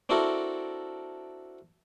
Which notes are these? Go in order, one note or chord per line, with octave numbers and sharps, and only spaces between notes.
C4 D4 E4 F#4 A4 A#4